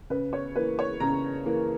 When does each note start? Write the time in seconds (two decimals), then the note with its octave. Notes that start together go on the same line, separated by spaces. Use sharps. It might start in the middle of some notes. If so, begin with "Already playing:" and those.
0.10 C#3 B4
0.33 C#5
0.55 E3 A#3 B4
0.79 C#5
1.00 C#3 A#5
1.46 E3 A#3